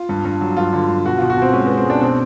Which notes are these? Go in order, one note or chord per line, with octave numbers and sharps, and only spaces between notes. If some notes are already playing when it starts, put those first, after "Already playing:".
Already playing: F4
G2
G2
F#3
G2 F4
D3
G2
B2 F#4
F4
B2
F#4
B2 C4
G#3 C#4
B3
G#3
C4
G#3 D4
B2 C4